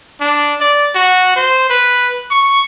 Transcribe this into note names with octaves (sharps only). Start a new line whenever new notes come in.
D4
D5
F#4
C5
B4
C#6